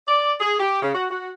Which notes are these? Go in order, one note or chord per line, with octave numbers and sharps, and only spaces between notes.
D5
G#4
G4
C#3
F#4
F#4